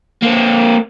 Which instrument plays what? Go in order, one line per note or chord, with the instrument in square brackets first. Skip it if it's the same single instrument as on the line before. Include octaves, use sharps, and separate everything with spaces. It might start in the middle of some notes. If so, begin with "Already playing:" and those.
[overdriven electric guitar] A#3 C4